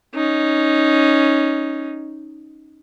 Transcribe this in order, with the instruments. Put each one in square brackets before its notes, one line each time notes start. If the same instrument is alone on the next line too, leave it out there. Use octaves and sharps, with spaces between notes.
[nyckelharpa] C#4 D#4